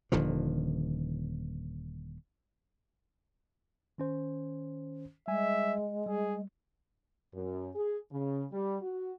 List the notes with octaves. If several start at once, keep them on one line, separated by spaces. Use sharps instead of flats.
D#1 D3 D#3 F3
D#3 C#4 C5
G3 G#3 E5 G#5
G3 G#4
F#2
G#4
C#3
G3
F#4